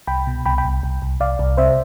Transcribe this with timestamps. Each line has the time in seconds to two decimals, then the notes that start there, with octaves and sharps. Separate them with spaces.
0.07 C2 G5 B5
0.27 B2
0.46 C2 G5 B5
0.58 G5 B5
0.64 C2
0.83 C2
1.02 C2
1.20 C2 D5 F5
1.39 C2
1.57 C3 C5 E5